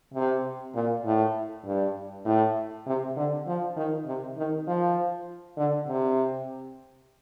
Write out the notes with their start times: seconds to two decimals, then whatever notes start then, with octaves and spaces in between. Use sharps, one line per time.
0.14 C3
0.75 A#2
1.05 A2
1.66 G2
2.25 A2
2.87 C3
3.16 D3
3.47 F3
3.77 D#3
4.06 C3
4.37 D#3
4.68 F3
5.57 D3
5.88 C3